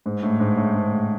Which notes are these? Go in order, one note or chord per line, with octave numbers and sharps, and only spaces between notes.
G#2
A2
G#2
A2
G#2